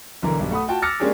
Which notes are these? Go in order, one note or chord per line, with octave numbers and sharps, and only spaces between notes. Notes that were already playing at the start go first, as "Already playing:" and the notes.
B1 D3 E3 A#4 A#5
B1 G2
A3 F#5 B5 D#6
F4 F#4 G5 A5
D6 E6 F6 A6 A#6 C#7
G#3 A#3 C#4 D4 G4 G#4